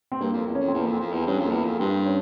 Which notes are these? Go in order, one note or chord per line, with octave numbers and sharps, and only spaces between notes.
C4
G2 A#3
F2
A#3
E2
F2 C#4
C4
E2
A#3
F2
C4
F2
E2
G2 C#4
F2 A#3
E2
F2 A#3
G2 C4
C#4